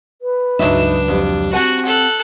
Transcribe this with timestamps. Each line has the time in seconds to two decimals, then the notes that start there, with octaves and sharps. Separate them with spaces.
0.22 B4
0.59 C#2 G2 F#3 D4 D#4 E5 E7
1.08 F2 G3
1.53 C4 F#4 F#5 G#5 A5
1.85 A4 F#6